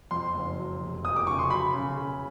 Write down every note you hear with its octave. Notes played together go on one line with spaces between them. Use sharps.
F2 C6
F#1
F#3
F1
F1 D#6
D6
C#3 C#6
C6
F#3 B5
C#3
C#3